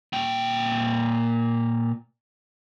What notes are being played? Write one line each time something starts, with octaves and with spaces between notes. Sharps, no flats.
A#2 G5